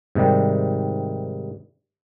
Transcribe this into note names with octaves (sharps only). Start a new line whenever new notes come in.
G#2 C3 D#3 G3